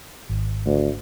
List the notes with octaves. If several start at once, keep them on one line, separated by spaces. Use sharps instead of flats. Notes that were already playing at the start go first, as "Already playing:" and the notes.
G#1
D2